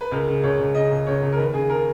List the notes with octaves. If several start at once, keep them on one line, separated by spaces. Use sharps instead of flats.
B4
C#2 A#4
C#3
C#2 C#5
C#2
C#3 D#5
C#2
C#2 C#5
C#2
A#4
D#2 B4
C#3 G#4
C#3 A#4